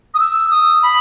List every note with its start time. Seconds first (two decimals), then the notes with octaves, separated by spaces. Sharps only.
0.14 D#6
0.19 E6
0.51 D#6
0.83 B5